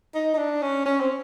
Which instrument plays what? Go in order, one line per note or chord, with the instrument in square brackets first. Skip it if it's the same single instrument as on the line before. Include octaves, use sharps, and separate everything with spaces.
[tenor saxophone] D#4
D#4
D4
C#4
C#4
C4